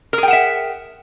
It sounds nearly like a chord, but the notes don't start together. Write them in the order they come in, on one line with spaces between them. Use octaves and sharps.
A#4 G#4 G5 F#5 E5